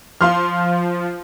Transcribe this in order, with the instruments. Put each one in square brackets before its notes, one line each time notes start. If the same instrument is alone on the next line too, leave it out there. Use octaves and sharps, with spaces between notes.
[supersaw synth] F3 [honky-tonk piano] F5 C6 F6